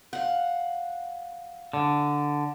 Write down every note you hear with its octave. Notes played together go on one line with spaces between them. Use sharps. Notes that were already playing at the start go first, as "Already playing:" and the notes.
F5 F#5
D3